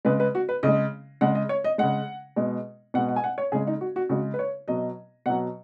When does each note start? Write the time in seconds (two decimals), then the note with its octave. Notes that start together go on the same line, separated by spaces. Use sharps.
0.05 C#3 G#3 B4
0.20 B4
0.35 F#4
0.49 B4
0.63 C#3 G#3 D#5
1.21 C#3 G#3 F#5
1.35 D#5
1.49 C#5
1.64 D#5
1.78 C#3 G#3 F#5
2.36 B2 G#3
2.94 B2 G#3 F#5
3.09 F#5
3.16 G#5
3.24 F#5
3.38 C#5
3.52 C#3 G#3 G#4
3.67 D#4
3.81 F#4
3.96 F#4
4.09 C#3 G#3 F#4
4.34 B4
4.39 C#5
4.68 B2 F#3 D#5
5.26 B2 F#3 F#5